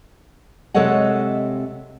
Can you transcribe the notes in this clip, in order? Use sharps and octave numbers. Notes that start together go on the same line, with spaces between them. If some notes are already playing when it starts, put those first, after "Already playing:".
C3 G#3 A4 C#5 D#5 F#5